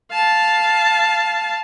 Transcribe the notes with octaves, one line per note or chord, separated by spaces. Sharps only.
F5 A5